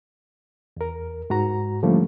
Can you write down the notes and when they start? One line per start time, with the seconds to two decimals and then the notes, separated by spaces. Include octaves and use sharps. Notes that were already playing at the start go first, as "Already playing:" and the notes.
0.77 E2 A#4
1.30 G#2 F#4 A#5
1.83 D3 F3 G3 A3 A#3 C#4